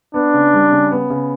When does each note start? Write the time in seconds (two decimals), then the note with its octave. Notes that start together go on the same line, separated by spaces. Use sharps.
0.14 B3 D4
0.34 C#3
0.54 G3
0.72 C#3
0.92 B3
1.10 C#3